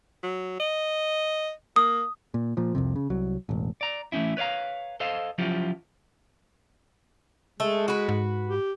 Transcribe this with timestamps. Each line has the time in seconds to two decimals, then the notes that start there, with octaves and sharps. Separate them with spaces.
0.23 F#3
0.60 D#5
1.76 A#3 D#6
2.34 A#2
2.57 A#2 F3
2.75 C2 F2 C3
2.96 C#3
3.10 C2 F#3
3.49 E1 A1
3.81 D5 A#5
4.12 E3 A3 C4 C#4 E4
4.37 B4 C#5 D5 F5 A#5
5.00 A4 C5 D#5 F5
5.38 F3 F#3 C#4 E4 F4 G4
7.60 G#3 A3
7.88 F#4 B4
8.09 G#2
8.48 G4